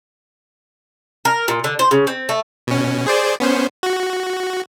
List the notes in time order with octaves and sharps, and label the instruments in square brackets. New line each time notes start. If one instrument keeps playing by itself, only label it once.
[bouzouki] A#4
A#2
D3
C5
C#3
C4
A3
[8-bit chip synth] B2 C#4
G#4 C5 D5
B3 C#4 C5
F#4